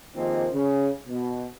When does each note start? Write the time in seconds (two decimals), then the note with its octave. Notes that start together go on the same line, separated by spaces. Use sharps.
0.15 C3 D#3 F3 G#3 A#3 C4
0.52 C#3
1.07 B2